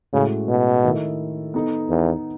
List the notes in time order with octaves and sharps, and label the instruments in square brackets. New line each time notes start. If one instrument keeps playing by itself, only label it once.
[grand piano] A2 G#3 C#4 F#4 A4 [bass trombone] C#3
[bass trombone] B2
[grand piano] D#3 A3 E4 A4 D#5
B3 D#4 A4 D#5
[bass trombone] E2